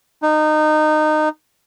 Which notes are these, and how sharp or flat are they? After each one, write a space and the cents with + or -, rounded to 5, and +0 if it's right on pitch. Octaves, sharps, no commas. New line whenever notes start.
D#4 -20